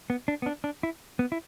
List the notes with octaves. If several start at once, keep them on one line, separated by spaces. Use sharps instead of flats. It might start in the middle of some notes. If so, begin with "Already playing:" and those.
B3
D4
B3
D4
D4
E4
B3
E4